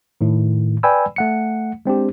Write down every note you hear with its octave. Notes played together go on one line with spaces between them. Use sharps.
A2 D#3
B4 D5 G5 G#5 B5 E6
A3 F#5 C#7
G#3 C4 D4 G4